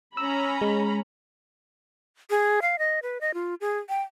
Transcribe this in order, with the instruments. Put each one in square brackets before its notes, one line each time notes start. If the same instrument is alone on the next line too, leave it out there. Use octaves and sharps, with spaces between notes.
[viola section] C#4 A#5 B5 [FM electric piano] E6
[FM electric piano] G#3
[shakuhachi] G#4
F5
D#5
B4
D#5
F4
G#4
G5